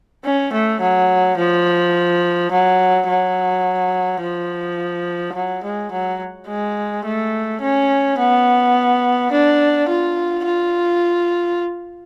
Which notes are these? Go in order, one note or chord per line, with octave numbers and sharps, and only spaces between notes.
C#4
A3
F#3
F3
F#3
F#3
F3
F#3
G#3
F#3
G#3
A3
C#4
B3
D4
F4
F4